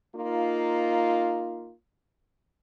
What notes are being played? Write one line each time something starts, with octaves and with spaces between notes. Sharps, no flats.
A#3 D#4 F4